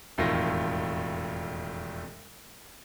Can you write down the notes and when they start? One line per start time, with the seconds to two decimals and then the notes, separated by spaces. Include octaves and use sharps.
0.18 E1 F2 A2 D#3 F4 A#6